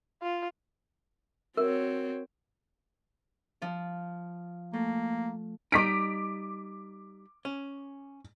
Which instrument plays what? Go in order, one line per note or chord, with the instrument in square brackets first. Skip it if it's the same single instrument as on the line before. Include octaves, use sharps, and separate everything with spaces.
[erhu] F4
[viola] C4 [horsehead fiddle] F#4 C#5 [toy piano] A#4
[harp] F3 F4
[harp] A3 [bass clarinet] A#3
[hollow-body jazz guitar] G3 D#4 [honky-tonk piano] D6 B6 D7
[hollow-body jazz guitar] C#4